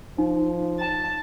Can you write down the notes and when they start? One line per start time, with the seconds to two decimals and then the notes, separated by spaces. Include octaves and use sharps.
0.18 F3 D#4
0.80 A5